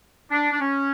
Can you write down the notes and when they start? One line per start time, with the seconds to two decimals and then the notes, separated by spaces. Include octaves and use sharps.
0.31 D4
0.51 D4
0.60 C#4